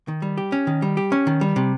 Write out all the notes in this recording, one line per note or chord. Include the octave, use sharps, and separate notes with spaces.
D#3
G3
G4
C#4
D#3
G3
G4
C#4
D#3
G3
C3